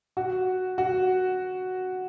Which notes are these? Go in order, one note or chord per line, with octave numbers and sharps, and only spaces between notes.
F#4
F#4